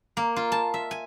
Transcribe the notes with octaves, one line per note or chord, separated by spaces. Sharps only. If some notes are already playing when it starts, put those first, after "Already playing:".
A#3
F4
A5
E5
G#5